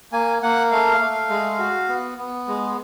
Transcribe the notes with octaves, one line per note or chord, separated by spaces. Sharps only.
A#3 G#5
A#3 F#5
A3 F5
A3
G#3
F#4
B3
B3
G#3